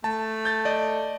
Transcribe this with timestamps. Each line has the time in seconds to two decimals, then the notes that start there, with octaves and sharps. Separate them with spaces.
0.04 A3 A5
0.45 G6 A6
0.65 D5 D#5